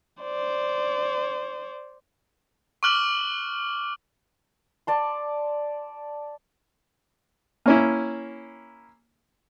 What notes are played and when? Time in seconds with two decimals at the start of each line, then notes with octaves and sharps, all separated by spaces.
0.23 C5 D5
2.83 C#6 D6 F6 F#6 F#7
4.87 D5 A5 C6
7.66 A#3 C#4 E4